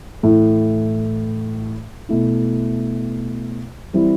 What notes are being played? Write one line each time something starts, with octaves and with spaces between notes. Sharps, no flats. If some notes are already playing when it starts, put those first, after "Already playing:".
A2 E3 A3
B2 A3 E4
E3 G3 C4 E4